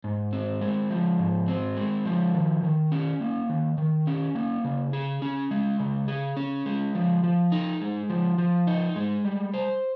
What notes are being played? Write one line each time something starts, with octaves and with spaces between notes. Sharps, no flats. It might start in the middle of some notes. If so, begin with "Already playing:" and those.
G#2
C4
G#3
F3
G#2
C4
G#3
F3
D#3
D#3
C#4
A#3
D#3
D#3
C#4
A#3
C#3
G#4
C#4
G#3
C#3
G#4
C#4
G#3
F3
F3
D#4
G#3
F3
F3
D#4
G#3
G3
C5